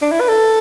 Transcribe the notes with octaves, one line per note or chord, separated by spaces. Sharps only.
D4
E4
B4
A4